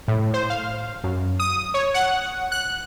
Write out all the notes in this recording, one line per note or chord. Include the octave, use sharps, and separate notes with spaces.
A2
C5
F5
F#2
D#6
C#5
F#5
F#6